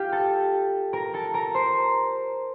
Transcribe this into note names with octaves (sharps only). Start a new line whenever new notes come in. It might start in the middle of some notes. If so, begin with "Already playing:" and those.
Already playing: F4 G4 F5 G5
A4 A5
A#4 A#5
A4 A5
A#4 A#5
C5 C6